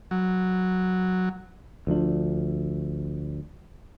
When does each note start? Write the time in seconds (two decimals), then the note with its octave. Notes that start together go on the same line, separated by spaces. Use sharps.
0.11 F#3
1.87 D2 F3 D4